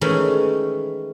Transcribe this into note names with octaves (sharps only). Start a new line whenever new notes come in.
D#3 E3 G#3 A3 C#4